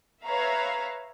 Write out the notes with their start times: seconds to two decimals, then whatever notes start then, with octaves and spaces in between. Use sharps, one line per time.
0.24 B4 C#5 E5 F5 A#5